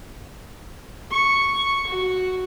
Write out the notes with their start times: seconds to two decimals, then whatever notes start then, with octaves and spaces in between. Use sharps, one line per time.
1.11 C#6
1.88 F#4